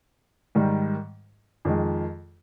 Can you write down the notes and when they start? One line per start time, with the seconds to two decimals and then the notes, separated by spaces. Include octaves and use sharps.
0.55 G#2 D#3 G3
1.65 F2 D#3 G#3